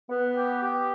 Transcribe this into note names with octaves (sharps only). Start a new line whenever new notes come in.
B3
G4
G4